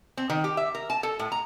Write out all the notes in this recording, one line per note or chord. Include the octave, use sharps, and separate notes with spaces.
C4
D#3
G4
E5
A#4
A5
A4
A2
A#5